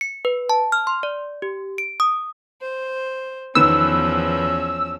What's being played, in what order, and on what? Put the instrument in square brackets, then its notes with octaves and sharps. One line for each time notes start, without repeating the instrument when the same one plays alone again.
[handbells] C#7
B4
A5
F6
C6
D5
G4
D7
D#6
[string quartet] C5
[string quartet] E2 F3 C#4 [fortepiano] D#3 B3 [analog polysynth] E6